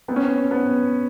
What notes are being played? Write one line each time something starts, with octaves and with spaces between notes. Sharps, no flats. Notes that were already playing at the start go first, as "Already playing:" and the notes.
B3 C4
C#4
C4
B3